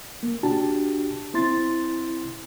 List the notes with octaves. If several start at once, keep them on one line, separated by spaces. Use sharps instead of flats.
A#3
D4 F#4 G4 A5
C4 E4 C6 A6